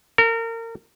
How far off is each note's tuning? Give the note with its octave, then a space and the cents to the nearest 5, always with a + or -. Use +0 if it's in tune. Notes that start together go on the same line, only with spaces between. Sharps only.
A#4 -30